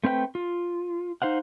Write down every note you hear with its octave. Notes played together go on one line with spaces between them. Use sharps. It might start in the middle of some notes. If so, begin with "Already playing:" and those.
A3 C4 B4 F5 G5
F4
D#4 C5 F5 F#5